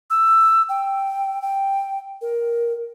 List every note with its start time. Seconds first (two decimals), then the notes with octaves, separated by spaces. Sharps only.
0.10 E6
0.69 G5
1.42 G5
2.21 A#4